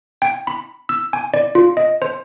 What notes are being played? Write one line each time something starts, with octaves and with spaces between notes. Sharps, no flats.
G5
B5
E6
G#5
D5
F4
D#5
C5